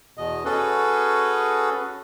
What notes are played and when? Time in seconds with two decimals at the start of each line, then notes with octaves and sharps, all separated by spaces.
0.18 E2 B2 D#5
0.45 C#4 F#4 G#4 A4 B4